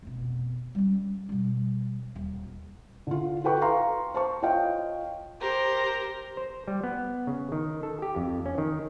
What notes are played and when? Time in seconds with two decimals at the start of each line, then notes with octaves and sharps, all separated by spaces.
0.02 F1 B2
0.75 G3 C#4
1.29 B2 G3
2.16 D#1
3.07 D3 F4
3.44 F#4 A4 B4 G5 C#6
3.61 F5 A#5 C6 C#6
4.14 C5 A5 C#6
4.42 F4 C#5 D#5 F5 G5
5.40 G4 A#4 C5
6.37 C5
6.68 G3
6.84 B3
7.27 C#3
7.52 D#3
7.83 A4
8.02 G4
8.16 F2
8.46 C#4
8.58 D#3